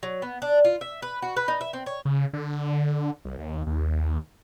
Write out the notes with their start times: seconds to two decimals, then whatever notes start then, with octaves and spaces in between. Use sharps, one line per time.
0.03 F#3
0.22 B3
0.42 D4
0.65 F4
0.81 E5
1.02 B4
1.22 F#4
1.37 B4
1.48 D#4
1.61 E5
1.73 C4
1.86 C#5
2.05 C#3
2.33 D3
3.25 C2
3.39 D#2
3.67 D#2